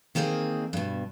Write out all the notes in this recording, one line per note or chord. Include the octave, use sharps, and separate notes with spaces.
D#3 A#3 C4 G#4 D#5
G2 B2